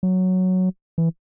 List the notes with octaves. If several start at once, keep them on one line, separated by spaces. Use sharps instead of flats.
F#3
E3